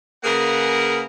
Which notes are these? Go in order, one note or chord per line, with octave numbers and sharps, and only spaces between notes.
C#3 A#3 G#4 A#4 B4 F#5